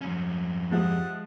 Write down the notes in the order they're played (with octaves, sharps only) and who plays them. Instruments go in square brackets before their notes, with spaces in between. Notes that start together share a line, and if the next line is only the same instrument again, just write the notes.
[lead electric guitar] F2 C#4
[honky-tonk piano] F3 G#3 [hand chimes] G4 E5 D#6 [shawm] F#5